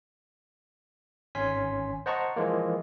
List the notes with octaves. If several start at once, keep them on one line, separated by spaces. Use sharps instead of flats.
G#1 C#4 G#5 C6 B6
C5 D#5 F#5 A5 A#5 C#6
E3 F3 G#3 A#3